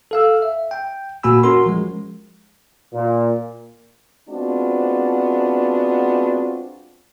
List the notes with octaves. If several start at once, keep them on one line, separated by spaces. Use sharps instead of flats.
A4 F5 E6
E5
G5
A#2 A#3 F#4 G#5 B5 E6
C#4 F#4 A#4 C6
F3 G#3
A#2
G#3 B3 C4 D4 F4 F#4